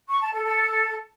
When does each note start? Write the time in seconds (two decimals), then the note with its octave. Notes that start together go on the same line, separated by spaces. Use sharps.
0.09 C#6
0.21 A5
0.33 A4
0.45 A4